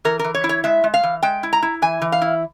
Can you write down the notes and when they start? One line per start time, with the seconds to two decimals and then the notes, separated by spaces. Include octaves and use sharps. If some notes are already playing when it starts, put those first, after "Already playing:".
0.05 E3 A#4
0.19 E3 A#4
0.34 C#5
0.44 E4
0.49 C#5
0.64 G#3 E5
0.84 G#3
0.94 F5
1.03 E3
1.23 G#3 G5
1.43 E4
1.53 A#5
1.62 E4
1.82 E3 G#5
2.02 E3
2.12 F5
2.22 E4